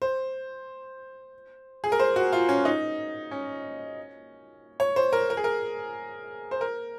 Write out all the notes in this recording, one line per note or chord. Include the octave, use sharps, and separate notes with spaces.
C5
G#4
A#4
C5
F#4
F4
C#4
D#4
C#4
C#5
C5
A#4
A#4
G#4
A#4
C5
A#4